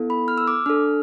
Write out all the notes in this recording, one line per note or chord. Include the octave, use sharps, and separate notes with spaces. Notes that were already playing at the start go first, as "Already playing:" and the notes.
Already playing: B3 E4 A4
B5
F6
E6
D6
D4 A4 F6